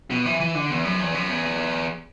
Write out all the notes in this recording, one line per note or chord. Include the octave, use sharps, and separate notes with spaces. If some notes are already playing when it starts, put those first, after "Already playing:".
B2
E3
E3
D3
E2
F#2
E2
F#2
E2